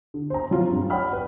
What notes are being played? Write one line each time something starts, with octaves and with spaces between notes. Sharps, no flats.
D3
C5 A#5
F#3 C4 F4
G2
C#5 D5 F#5 G5 B5 F6
B4